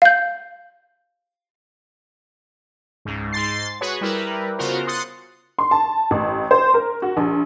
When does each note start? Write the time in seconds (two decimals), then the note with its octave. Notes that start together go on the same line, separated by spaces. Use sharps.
0.02 F5 G6
3.05 C#2 G#2
3.33 G#2 C6 A6 C7
3.81 F#4 G#4 B4 C#5
4.01 G3 E4 A#4 B4
4.58 C#3 B3 F4 F#4 A#4 C5
4.87 C6 D#6 F#6 A6 C#7
5.59 C6
5.71 A5
6.11 A1
6.51 C5
6.74 A#4
7.02 F#4
7.17 A#1